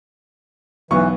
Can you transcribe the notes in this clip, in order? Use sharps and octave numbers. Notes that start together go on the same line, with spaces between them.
B1 E3 B3 C#6